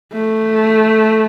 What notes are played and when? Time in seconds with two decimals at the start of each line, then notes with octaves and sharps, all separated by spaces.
0.13 A3